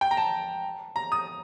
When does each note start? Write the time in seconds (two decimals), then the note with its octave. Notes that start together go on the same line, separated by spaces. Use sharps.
0.01 G5
0.11 A#5
0.17 A5
0.96 A#5
1.12 D#6